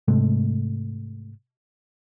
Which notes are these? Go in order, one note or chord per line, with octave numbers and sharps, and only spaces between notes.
G#2 C3 G#3 A3